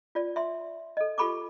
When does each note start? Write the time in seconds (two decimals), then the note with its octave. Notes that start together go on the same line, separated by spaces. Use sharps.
0.15 F4 D5
0.36 E5 C6
0.97 A4 D#5
1.18 F4 G4 A4 B5 C#6 D6